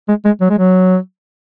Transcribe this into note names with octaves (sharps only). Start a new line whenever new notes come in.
G#3
G#3
F#3
G#3
F#3